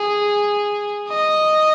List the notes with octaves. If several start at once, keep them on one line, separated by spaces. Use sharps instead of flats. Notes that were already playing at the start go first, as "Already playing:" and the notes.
Already playing: G#4
D#5